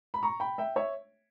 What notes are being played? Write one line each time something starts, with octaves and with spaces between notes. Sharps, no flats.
B5
A#5 C#6
G5 B5
E5 G5
C#5 E5